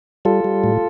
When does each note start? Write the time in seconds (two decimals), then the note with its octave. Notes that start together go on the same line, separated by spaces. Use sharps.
0.25 G3 F4 A4
0.44 G3
0.64 A2